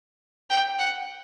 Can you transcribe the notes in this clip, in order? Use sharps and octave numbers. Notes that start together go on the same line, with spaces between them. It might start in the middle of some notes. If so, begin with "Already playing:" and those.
G5
F#5